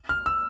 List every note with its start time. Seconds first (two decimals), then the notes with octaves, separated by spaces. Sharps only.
0.09 F6
0.26 E6